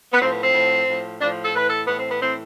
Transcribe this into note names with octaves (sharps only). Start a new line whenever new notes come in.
B3
A2 F3 C4
B3
C4
A2 F3
A2 F3
A2 F3 D4
A4
A2 E3 B4
A4
A2 E3 B3
C4
B3
A2 E3 C4